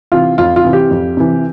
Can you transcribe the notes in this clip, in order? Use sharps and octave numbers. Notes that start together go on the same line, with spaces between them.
C3 E3 F4
F2 F4
F4
C3 E3
G4
F2
C3 E3